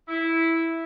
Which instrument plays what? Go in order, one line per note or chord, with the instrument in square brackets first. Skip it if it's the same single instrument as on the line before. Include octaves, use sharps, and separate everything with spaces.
[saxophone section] E4